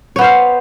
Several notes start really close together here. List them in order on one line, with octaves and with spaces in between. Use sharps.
C#5 B3 C5 F5